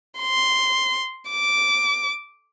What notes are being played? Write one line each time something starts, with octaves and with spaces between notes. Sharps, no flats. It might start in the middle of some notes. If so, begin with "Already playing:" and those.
C6
D6